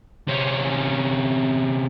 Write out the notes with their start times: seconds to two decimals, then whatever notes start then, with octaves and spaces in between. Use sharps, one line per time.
0.28 C3 C#4